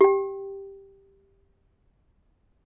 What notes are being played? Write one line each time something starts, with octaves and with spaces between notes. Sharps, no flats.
G4 G5